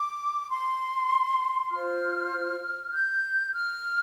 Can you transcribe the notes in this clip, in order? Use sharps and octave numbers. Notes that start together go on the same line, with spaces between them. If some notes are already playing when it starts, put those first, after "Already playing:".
Already playing: D6
C6
F4 C5 F6
G6
F6